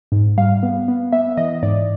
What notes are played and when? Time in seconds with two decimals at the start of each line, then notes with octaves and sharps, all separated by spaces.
0.12 G#2
0.38 G3 F5
0.63 B3
0.88 B3
1.12 B3 E5
1.37 E3 D#5
1.63 G#2 D5